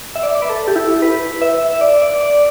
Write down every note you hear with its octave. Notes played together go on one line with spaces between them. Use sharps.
E5
D5
D5
B4
A4
G4
E4
B4
E5
D5
D5
D5